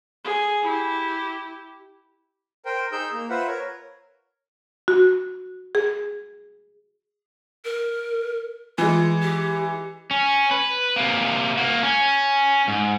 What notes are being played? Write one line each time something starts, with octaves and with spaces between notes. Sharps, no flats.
G#4
E4 G4
A#4 C5 G5
D#4 G#4 E6 G6
A#3
F4 B4 C5 E5 F#5
A#4 C#5
F#4
G#4
A#4
E3 G#3 F4
G4
C#4
B4
C3 A#3
A#3 F#4
C#4
G#2